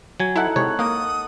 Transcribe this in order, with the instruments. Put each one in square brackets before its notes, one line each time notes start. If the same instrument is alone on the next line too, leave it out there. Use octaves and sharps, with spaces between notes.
[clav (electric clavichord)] F#3 G#5
[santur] D#4 A4 F#5 [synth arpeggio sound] E4
[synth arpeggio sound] C3 G#3 [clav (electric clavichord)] C#5
[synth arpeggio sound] A#3 [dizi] D#6